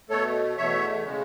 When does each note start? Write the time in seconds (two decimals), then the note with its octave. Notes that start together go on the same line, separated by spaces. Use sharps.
0.10 B2 A3 A4 C#5
0.57 E2 B2 A3 C#5 E5
1.04 C#3 G#3